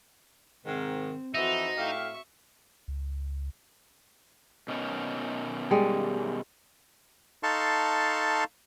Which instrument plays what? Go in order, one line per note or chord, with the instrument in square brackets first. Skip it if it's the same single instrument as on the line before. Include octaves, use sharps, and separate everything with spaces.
[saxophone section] G#2 C3 D#3 [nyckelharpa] C4
[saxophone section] F2 E3 E5 [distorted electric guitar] D#4 [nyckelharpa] F#4 C5
[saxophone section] A2 G4 F5 [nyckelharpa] E5 C#6
[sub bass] C#2
[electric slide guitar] B2 D#3 C#4
[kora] G3 G#3
[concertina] D#4 A4 F5 A5 C6 C#6